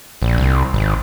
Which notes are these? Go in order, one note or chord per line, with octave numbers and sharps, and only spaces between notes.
A#1
C2
G#1